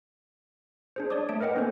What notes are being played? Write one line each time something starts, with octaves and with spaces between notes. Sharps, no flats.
D4 G#4 C5
C#5 D5 A5 D6 D#6
A3 A5 D7
A#4 B4 D#5 F#5 G5
A#3 C4 D4 A4 C5 G#5